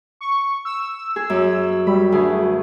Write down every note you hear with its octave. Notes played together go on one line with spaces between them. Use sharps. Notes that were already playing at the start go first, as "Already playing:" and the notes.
C#6
E6
G#4
F#2
G3 B5
D2 G#4